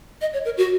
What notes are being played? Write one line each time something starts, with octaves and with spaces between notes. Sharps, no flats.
D#5
C#5
A#4
F#4